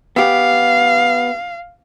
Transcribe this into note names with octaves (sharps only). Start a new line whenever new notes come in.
B3 G4 F5